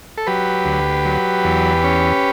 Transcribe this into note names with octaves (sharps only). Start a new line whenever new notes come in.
A4
F#3 G4 B4
D2
F#3
E2
C#4